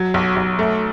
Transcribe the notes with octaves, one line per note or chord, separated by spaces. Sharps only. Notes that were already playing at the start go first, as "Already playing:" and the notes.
Already playing: F#3
B1
B1
A3